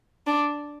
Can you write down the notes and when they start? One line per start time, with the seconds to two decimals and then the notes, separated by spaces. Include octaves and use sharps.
0.27 D4